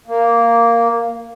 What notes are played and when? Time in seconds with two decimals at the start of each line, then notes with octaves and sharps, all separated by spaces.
0.08 A#3